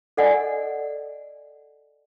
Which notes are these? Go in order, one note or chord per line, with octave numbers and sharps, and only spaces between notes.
A4 D5 D#5 F#5 G#5